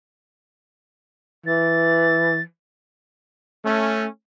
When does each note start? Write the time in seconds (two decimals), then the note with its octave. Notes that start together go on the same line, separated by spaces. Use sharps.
1.46 E3 A6
3.64 A3 C#4